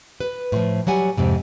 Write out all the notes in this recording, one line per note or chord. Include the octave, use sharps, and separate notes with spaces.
B4
A2 F3
F#3 G3 F#5 G#5
F2 G#2 C3